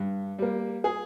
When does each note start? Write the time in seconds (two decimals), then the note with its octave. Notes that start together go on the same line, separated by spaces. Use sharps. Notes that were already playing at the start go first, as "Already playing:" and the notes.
Already playing: G2
0.39 G3 A#3
0.84 G#4